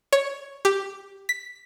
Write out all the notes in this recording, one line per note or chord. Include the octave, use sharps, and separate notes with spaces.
C#5
G4
B6